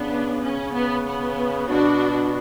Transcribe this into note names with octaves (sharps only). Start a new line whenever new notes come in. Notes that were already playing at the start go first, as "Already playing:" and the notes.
Already playing: C#3 B3 D4
C#3 C#4
B3
B3
B2 D4 F#4